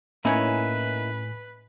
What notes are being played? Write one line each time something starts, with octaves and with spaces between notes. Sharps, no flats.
A2 A#3 C#4 D#4 E4 B4 C#5 G#5